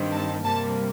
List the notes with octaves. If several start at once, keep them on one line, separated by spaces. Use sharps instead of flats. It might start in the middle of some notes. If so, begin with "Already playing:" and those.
Already playing: G2 D#3 G3 C4
A5
C3 G3 A#3 A5